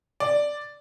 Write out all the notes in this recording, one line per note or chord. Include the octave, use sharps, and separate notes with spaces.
D5